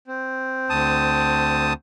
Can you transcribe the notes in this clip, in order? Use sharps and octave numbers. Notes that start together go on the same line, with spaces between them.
C4
D2 A5 D#6